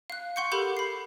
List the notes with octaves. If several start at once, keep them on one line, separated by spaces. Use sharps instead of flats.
F5 F#6
F#5 C6 C#6 G6 C#7
G4 A4 A#4 B5 D6 G6
B5 C7